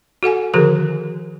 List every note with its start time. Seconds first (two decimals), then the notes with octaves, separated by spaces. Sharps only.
0.23 F#4 A4 F#5 G#5
0.54 D3 D#3 F3 F#4 G#4 A#4